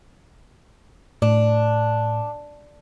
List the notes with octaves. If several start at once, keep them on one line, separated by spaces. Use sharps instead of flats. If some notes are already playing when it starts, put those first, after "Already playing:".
A2 D4